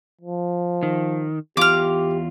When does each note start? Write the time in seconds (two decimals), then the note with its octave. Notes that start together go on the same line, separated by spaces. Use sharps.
0.21 F3
0.83 D#3
1.57 E2 F4 G4 D6 F6